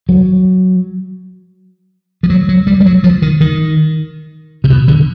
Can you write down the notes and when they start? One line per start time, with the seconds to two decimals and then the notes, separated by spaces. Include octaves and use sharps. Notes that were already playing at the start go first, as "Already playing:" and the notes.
0.09 F#3
2.23 F3
2.30 F#3
2.49 F#3
2.67 G3
2.80 G3
2.86 F#3
3.04 F3
3.22 D#3
3.41 D#3
4.64 C3
4.70 B2
4.88 D3